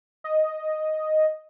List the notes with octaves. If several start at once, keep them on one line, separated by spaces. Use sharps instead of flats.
D#5